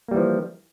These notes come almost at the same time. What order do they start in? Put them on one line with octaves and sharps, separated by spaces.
A#3 G3 E3 F3